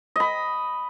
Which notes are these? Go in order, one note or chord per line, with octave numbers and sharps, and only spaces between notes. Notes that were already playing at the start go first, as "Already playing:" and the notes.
D#5 B5